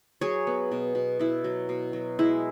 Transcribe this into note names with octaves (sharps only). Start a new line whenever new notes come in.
F#3 G#4 C#5
B3
B2
B2
B2 E4
F#3
B2
F#3
G#3 E4